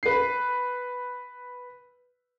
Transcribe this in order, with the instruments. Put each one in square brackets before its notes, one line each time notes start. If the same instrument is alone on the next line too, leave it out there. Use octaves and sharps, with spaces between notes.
[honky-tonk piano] B4 C7